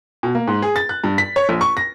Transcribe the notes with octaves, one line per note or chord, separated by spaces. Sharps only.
B2
A#3
G#2
G#4
A6
F#6
G2
B6
C#5
A#1
C#6
A#6